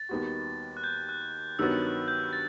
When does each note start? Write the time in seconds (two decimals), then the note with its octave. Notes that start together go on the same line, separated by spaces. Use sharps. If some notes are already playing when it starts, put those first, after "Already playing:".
Already playing: A6
0.09 D#2 D#3 G3 B3 F#4
0.77 F#6
0.84 G6
1.09 F#6
1.59 G2 D#3 F#3 B3 F#4 E6
1.82 F#6
2.08 G6
2.33 A6